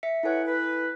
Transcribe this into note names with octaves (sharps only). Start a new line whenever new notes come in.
E5 B6 C#7
E4 A4 B4 C#5 F#5 G#5
B4